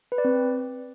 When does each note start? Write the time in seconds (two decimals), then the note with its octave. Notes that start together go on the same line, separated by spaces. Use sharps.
0.12 B4
0.18 D5
0.25 C4